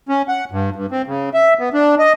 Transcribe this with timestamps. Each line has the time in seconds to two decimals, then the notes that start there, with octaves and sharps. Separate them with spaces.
0.09 C#4
0.28 F#5
0.51 G2
0.76 G2
0.91 C4
1.07 C#3
1.34 E5
1.59 B3
1.73 D4
1.99 D#5